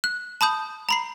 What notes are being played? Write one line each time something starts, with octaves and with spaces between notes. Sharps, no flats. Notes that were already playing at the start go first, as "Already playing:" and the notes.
F#6
A5 B5 D#6 G6
A#5 B5 C7